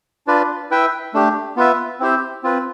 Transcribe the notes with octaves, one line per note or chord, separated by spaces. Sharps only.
D4 F4 B4 D5
E4 B4 E5 G5
A3 D4 G4
B3 F4 B4 E5
C4 E4 G4 C5
C4 F4 B4